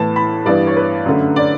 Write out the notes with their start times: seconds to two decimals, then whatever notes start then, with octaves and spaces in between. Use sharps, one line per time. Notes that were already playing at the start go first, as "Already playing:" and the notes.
Already playing: A2 E3 B3 A5
0.16 B5
0.45 G2 E3 B3 D5
0.67 C#5
0.77 B4
1.06 F#2 D3 A3
1.36 D5